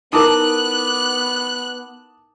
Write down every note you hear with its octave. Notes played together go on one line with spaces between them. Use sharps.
B3 D#4 E4 A#4 A5 D6 D#6 F#6